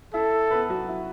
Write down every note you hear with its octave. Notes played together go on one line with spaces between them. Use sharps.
E4 A4 E5
B3 B4
F#3 F#4
E4